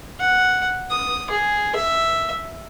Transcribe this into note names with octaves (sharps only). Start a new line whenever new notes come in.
F#5
D#6
G#4
E5